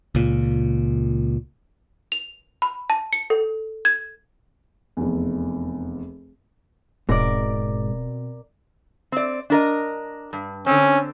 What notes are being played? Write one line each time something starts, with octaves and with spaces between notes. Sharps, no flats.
C#2 A#2
F7
B5
A5
C#7
A4
G#6
F1 E2
D#1 G#2 B2 C4 A#4 D5
C4 D5
D4 A#4 D#5
G2
D3 C4 C#4